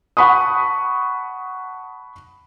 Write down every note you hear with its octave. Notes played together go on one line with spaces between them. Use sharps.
F#5 A5 B5 C#6 D#6